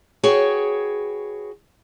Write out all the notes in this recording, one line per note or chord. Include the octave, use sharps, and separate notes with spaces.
F#4 G#4 B4 C#5 G5